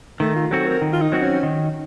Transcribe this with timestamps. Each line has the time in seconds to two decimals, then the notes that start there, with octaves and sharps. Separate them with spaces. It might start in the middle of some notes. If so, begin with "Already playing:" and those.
0.20 D#3 A3
0.36 F4
0.51 F#3 C4 F#4 A4
0.67 A#4
0.82 D#3
0.93 F4
1.02 D#4
1.12 F#3 C4 F#4
1.22 C#4
1.43 D#3